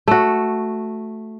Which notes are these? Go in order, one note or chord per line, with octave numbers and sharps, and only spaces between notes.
A3 F#4